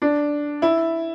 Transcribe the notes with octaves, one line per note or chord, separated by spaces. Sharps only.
D4
E4